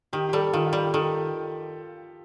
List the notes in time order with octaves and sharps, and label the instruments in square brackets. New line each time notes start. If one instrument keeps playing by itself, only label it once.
[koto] D#3 [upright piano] G4
[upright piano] G4
[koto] G3 [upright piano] A4
[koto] D#3 [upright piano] F4
[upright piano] F4
[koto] G3 [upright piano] G4
[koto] D#3 [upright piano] A4